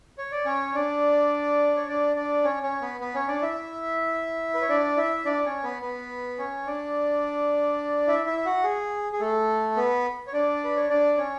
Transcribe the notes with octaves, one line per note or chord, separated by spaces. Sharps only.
C#5
D5
C#4 C#5
D4 D5
C#5
D4 D5
D4 D5
C#4 C#5
C#4 C#5
B3 B4
B3 B4
C#4 C#5
D4 D5
E4 E5
B4
C#5
D4 D5
E4 E5
D4 D5
C#4 C#5
B3 B4
B3 B4
C#4 C#5
D4 D5
E4 E5
E4 E5
F#4 F#5
G#4
G#4
A3 A4
B3 B4
C#5
D4 D5
B4
C#5
D4 D5
C#4 C#5